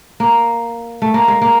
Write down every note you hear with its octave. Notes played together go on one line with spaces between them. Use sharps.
A#3
A3
A#3
G#3
A#3